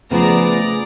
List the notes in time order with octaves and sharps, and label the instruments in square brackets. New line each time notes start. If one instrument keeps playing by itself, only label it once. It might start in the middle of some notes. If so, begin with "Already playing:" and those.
[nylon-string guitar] C#3 F3 [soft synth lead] A3 [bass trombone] B3 [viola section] G#4 D5 A#5